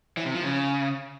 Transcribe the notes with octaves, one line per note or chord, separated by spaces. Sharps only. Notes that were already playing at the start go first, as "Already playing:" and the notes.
E3
C3
F3
C#3